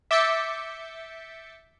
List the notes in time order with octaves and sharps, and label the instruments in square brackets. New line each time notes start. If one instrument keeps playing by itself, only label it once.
[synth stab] E5 D6 G6 A6 B6 C#7